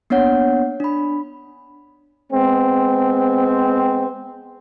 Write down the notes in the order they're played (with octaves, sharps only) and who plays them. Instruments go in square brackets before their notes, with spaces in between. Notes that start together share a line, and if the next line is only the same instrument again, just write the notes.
[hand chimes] A#3 B3 D4 C#5 F#5
D4 B5
[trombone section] G#3 B3 C4